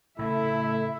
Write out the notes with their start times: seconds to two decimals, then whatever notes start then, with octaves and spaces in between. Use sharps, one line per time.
0.19 A2 C#3 A3 E4 E5